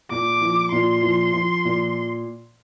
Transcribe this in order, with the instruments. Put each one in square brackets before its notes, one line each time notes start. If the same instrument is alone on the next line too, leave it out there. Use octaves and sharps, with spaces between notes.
[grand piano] A#2 [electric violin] D6
[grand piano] F3
[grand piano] A#2 [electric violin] C6
[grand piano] F3
F3
A#2